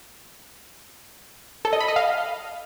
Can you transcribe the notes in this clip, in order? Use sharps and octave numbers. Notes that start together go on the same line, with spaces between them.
A4
D#5
B5
D#5
F5